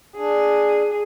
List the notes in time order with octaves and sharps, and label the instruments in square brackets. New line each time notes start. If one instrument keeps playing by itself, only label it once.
[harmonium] D4 [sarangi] G#4